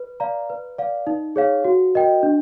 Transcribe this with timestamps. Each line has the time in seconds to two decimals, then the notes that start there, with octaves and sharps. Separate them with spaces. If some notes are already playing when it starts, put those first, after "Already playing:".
Already playing: B4
0.20 D5 F5 A#5
0.50 B4
0.78 D5 F5
1.07 D#4
1.36 G#4 C#5 F5
1.64 F#4
1.95 A#4 D#5 G5
2.23 D4